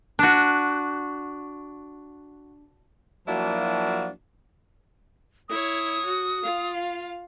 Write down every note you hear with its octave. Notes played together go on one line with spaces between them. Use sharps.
D4 F#4
F3 F#3 A#3 D4 E4 F#4
E4 C#5 D#6
F#4
F4 F5